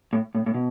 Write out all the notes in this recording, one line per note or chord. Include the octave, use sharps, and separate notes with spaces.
A2
A2
A2
B2